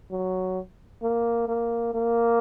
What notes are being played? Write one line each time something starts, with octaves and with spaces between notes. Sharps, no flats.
F#3
A#3
A#3
A#3